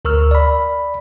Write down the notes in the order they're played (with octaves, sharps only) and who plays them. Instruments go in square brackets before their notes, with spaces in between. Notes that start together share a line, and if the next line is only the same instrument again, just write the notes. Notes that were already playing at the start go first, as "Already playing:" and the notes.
[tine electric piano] D2 A#4 C#6 E6 F6
D5 B5